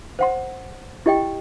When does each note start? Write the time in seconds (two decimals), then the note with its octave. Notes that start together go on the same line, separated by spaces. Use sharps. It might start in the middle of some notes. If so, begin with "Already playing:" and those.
0.19 C5 F#5 C6
1.06 E4 G4 D#5 G5